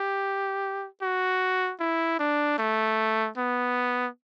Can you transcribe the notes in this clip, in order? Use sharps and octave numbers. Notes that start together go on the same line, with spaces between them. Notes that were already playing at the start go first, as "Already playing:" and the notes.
Already playing: G4
F#4
E4
D4
A3
B3